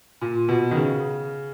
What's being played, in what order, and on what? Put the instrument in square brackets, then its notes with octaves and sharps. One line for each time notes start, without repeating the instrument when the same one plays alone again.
[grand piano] A#2
B2
D#3
C#3